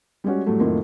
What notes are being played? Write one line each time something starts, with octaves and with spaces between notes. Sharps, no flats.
G3 G#3 C#4 F#4
A2 F#3 G3 A3
F2 A2 D#3 F#3 A#3 F4